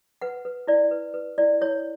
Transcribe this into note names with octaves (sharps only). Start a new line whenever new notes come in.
B4 F#5
B4
E4 D5
B4
B4
E4 D5
E4 C#5